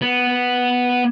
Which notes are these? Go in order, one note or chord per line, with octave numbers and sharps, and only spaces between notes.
B3